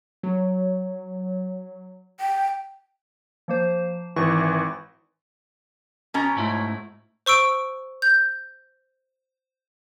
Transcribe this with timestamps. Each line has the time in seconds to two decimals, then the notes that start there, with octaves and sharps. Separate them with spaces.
0.23 F#3
2.20 G5
3.48 F3 A#3 C5
4.16 G#1 E3 C#6
6.14 B2 C#4 A#5
6.36 G#2 A3 E4
7.26 C5 C#6 E6 D7
8.02 G6